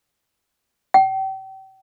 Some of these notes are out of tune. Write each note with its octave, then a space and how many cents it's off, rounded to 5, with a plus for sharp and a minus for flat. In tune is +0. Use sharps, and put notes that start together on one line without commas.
G5 -35